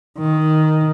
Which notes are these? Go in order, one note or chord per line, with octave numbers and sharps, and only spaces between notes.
D#3